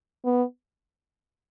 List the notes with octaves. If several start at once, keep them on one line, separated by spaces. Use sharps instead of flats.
B3